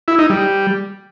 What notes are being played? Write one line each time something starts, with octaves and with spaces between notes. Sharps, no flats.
E4
D#4
G3